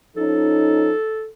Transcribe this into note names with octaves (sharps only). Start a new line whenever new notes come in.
F3 C#4 D#4 A4